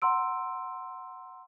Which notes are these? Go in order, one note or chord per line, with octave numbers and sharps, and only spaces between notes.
F#5 A#5 C6 E6 D7